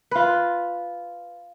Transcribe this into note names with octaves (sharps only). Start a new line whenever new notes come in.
F4 B4